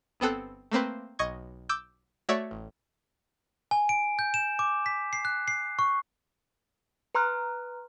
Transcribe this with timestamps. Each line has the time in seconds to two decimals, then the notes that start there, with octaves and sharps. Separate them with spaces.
0.20 G1 B3 C4 A4 F#6
0.72 A3 A#3 C4 B4
1.19 B1 D#5 C#6 G#6
1.69 D6 E6 G6
2.29 A3 F#4 C#5 D5 E5
2.51 A1
3.71 G#5
3.89 D7
4.19 G6
4.34 E7
4.59 D6
4.86 B6
5.13 C7
5.25 F#6
5.48 C7
5.79 C#6
7.15 B4 A#5 C6 F6 F#6